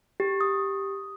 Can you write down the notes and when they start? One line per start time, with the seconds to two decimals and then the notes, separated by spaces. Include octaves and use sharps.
0.20 G4
0.41 D#6